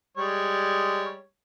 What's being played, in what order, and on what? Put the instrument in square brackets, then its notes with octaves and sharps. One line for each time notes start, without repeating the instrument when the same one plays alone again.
[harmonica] G3 G#3 C#5